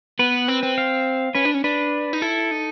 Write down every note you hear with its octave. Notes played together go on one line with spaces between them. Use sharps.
B3 B4
C4
C4
F5
C#4 B4
D4
C#4
D4 B4
D#4
E4 A4
D#4